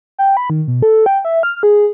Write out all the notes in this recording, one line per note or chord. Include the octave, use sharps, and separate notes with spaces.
G5
B5
D#3
B2
A4
G5
E5
F6
G#4